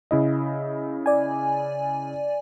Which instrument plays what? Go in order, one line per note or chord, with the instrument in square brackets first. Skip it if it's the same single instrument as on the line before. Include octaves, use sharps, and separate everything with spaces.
[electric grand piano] C#3 E4 D#5
[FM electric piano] D5 G#5